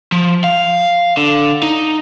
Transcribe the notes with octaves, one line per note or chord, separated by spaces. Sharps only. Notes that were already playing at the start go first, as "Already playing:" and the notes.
F3
F5
D3
D#4